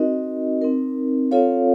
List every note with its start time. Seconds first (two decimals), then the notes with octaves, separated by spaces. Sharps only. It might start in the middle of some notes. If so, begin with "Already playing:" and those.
Already playing: C4 D#4 F#4 A#4 D#5
0.62 C4 D#4 A#4
1.31 C4 F4 A4 C#5 F5